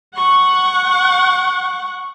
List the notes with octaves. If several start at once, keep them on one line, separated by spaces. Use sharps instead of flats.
F#5 C#6